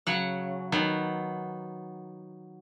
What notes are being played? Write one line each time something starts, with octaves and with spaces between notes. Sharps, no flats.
C#3 F#3 F#5
D#3 F#3 B3